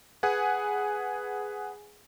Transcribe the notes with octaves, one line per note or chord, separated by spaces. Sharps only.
G#4 B4 F#5 G#5